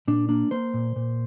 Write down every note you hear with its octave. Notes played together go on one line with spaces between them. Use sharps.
A#2 D4
A#3 D4
A#3 C5
A#2
A#2